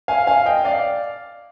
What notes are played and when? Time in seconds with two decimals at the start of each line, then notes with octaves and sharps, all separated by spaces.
0.08 F5 G#5
0.27 F5 G#5
0.46 D#5 G5
0.65 D5 F5